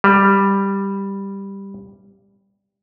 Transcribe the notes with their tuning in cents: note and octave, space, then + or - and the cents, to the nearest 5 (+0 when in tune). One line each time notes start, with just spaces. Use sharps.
G3 +5